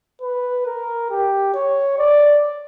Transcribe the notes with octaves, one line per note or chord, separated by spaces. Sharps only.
B4
A#4
G4
C#5
D5